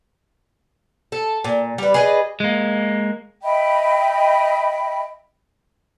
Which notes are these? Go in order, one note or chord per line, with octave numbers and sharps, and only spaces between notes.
A4
A#2
G3 B4
G#4 B4 D5 D#5
G#3 A#3
D#5 E5 G5 B5